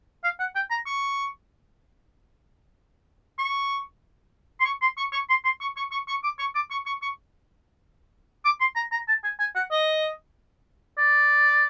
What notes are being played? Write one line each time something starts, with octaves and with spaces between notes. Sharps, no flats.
F5
F#5
G5
A#5
C#6
C#6
C6
C#6
C6
C#6
C#6
C6
C6
C#6
C#6
C#6
C#6
D6
C#6
D6
C#6
C#6
C#6
D6
C6
A#5
A#5
A5
G#5
G#5
F#5
D#5
D5